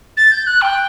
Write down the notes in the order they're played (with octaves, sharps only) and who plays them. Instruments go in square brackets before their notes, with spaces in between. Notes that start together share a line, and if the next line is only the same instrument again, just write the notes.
[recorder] A6
G6
F#6
G5